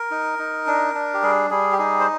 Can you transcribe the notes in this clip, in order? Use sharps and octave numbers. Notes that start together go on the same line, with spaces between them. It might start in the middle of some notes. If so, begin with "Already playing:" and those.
Already playing: A#4
D#4
D#4
D4
D4
G4
G3 G#4
G3 G#4
G4
D#4 G#4
C5